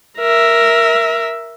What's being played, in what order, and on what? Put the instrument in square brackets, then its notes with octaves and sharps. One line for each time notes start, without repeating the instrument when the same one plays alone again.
[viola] A#4 E5